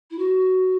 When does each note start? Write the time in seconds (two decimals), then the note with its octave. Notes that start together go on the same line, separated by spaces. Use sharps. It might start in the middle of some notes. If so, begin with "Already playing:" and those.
0.10 E4
0.18 F#4